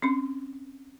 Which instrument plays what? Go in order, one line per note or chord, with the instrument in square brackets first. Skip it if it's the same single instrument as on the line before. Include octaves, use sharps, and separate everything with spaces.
[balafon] C4 C#4 C6